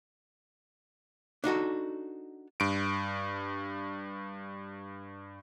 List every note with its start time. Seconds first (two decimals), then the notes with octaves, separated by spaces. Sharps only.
1.44 D4 D#4 F#4 A4
2.60 G2 D7